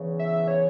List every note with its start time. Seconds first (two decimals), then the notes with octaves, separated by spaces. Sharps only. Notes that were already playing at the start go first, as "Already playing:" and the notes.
Already playing: E2 C#3 E3
0.19 E5
0.48 C#5